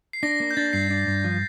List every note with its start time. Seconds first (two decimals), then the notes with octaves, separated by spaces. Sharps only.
0.13 C7
0.23 D4 A#6
0.40 A#3 A#6
0.51 G6
0.57 D4 A6
0.73 G2 C7
0.90 D4
1.07 G2
1.24 F3